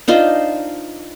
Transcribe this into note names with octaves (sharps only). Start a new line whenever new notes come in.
D4 D#4 F4 C5